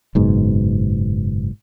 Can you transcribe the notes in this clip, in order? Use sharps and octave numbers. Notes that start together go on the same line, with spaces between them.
F#1 G#2 B2